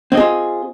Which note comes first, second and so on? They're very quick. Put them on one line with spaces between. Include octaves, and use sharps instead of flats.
C4 D#5 G#4 F4